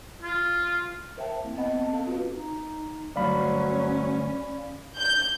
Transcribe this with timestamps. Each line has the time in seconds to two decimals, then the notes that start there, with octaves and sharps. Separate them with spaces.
0.22 F4
1.17 A#4 C5 E5 F5 G5 A5
1.45 A#3 C4 E4
1.57 B3 C4 D#5 F#5 B5
1.73 B3 C4 A5
1.91 C4 C#4 A4 F5
2.07 F4 F#4 B4
2.33 D#4
3.16 D2 G2 F#3 C#4 D5 F5 B5
4.96 G6